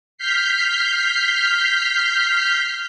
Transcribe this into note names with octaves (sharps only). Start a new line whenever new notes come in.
F6 G6 B6 C7